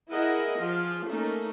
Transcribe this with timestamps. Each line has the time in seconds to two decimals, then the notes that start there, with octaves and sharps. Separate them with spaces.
0.10 E4 G#4 A#4 D#5 F#5
0.58 F3 F4 G#4
1.05 A3 A#3 C#4 D#4